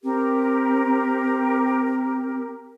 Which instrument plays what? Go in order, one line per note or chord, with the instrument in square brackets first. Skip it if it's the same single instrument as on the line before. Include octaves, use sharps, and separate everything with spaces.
[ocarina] C4 [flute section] G4 A#4